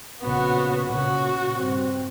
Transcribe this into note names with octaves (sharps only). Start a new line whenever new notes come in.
A#1 C#3 B3 F#4
A#2 C#3 F#4
G2 C4